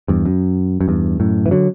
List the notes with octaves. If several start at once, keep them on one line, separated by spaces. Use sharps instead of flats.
E2 G2
F#2
F#2
E2 G2
F#2 A2
E3
D3 F#3